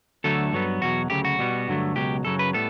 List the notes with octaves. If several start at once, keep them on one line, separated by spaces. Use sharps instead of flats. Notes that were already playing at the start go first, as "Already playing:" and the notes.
D2 D3 F#3 A3 A4
G2 F#3 B3
E2 B2 F#3 F#4
D2 C#3 F#3 G4
F#4
B2 G3 B3
G2 D3 F#3 A3
C#2 B2 F#3 G4
F#2 C#3 F#3 A4
B4
A2 G3 B3 A4